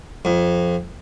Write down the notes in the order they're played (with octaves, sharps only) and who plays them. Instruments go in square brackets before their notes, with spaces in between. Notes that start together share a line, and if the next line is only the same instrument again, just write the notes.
[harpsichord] F2